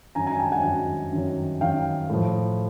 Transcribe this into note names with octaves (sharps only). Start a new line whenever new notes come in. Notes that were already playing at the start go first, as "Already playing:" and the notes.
F#2 D#3 F#3 G#5 A#5
G#5 A#5
G5 A5
F#5 G#5
F#2 D#3 F#3
F#2 D#3 F#3
F#2 D#3 F#3 F5 G5
A2 F3